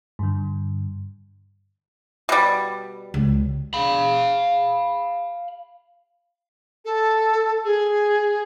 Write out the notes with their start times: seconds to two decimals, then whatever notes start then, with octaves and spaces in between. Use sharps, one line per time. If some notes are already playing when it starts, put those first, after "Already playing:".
0.19 G2 D3
2.29 B2 G3
3.14 C#2
3.74 F5 B5
6.85 A4
7.64 G#4